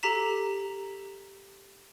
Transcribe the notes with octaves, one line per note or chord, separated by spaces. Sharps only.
G4 A4 A#5 B6 E7